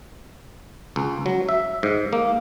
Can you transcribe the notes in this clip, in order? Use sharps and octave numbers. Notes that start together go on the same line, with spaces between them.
C#2
F#3
E5
G#2
A#3